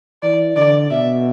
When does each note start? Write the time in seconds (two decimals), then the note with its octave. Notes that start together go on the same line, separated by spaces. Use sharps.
0.23 E3 D5
0.57 D3 D5
0.91 B2 E5